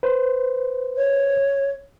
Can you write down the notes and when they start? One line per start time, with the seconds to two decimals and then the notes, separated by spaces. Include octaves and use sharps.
0.03 B4 C5
0.97 C#5